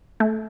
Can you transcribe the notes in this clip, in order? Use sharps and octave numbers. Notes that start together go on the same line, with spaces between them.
A3